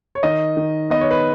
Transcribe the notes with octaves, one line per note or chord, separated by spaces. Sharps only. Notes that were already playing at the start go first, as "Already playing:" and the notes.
C#5
D#3 D#5
D#3
B3 D#5
C#5
B4